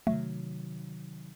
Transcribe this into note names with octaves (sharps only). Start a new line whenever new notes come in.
C3 D#3 F#3 A3